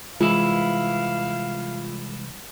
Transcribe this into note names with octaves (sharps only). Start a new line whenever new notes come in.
C2 E3 G#3 E4 F4 F5